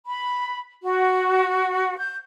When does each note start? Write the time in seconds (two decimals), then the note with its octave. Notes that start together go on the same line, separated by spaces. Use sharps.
0.05 B5
0.82 F#4
1.98 G6